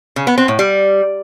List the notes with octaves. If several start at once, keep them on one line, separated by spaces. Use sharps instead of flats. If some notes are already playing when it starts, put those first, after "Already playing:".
C#3
B3
C4
A2
G3